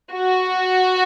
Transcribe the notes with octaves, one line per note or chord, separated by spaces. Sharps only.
F#4